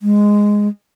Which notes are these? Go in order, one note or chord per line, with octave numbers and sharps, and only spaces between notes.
G#3